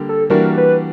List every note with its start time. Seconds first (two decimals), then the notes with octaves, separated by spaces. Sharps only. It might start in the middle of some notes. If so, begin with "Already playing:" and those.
Already playing: D3 G3 A#3
0.09 A4
0.30 E3 G3 A#3 D4 F#4 A#4
0.58 B4